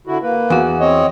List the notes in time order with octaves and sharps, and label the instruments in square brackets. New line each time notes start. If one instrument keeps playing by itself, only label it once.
[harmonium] D3 E4 F#4
A#3 B4
[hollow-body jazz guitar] E2 F#4
[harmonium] C4 C#5 D#5